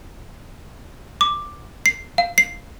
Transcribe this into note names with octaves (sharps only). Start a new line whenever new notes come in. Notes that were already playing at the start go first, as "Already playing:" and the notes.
D6
C7
F5
C7